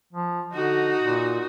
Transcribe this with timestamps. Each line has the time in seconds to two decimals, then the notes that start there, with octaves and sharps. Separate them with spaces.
0.13 F3
0.53 D3 D#4 F#4
1.01 A#2